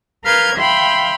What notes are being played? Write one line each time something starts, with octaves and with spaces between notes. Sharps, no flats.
A#4 B4 F5 F6 G6 G#6
E5 F5 G5 B5 C6